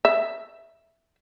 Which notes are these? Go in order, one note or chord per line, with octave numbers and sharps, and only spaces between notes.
E5